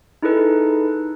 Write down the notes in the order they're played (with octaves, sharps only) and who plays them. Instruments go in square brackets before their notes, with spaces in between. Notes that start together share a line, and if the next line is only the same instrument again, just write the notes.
[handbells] D#4 E4 G#4 A4 B4